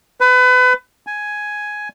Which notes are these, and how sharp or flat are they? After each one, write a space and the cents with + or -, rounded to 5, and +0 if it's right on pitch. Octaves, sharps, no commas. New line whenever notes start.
B4 +30
G#5 +5